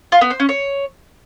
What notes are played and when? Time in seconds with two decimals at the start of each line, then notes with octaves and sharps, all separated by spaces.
0.12 F4
0.21 B3
0.30 C5
0.40 C#4
0.49 C#5